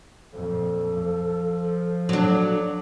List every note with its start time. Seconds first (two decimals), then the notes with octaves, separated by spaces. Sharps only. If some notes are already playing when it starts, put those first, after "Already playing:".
0.33 F2 A#2 A4
0.94 F3
2.09 F#3 D4 A4